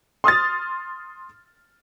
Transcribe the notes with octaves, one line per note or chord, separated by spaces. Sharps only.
C6 D#6 F6 A6